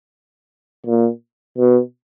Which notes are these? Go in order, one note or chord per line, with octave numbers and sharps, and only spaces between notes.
A#2
B2